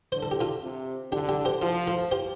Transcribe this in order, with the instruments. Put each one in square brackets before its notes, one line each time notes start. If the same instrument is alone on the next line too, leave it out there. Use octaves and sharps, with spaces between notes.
[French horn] D3 [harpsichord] C5
[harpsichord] A4
G4
F4 A4
[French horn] C3
[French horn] D3 [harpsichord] D4 G4
[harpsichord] D4 G4
G4 C5
[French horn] F3 [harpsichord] F4 A4
[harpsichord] F4 A4
G4 C5